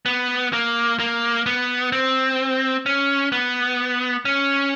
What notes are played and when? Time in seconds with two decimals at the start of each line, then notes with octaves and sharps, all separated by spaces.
0.06 B3
0.53 A#3
1.00 A#3
1.46 B3
1.92 C4
2.86 C#4
3.32 B3
4.25 C#4